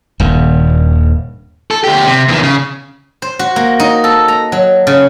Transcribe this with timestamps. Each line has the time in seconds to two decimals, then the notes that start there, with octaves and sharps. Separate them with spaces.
0.20 D#1 G2
1.71 A4
1.84 D2 G4
2.07 C3
2.28 E2 D#3
2.43 C#3
3.22 C5
3.39 F#4
3.56 A#3
3.80 D#4
4.04 A4
4.28 A#5
4.52 F#3
4.87 C#3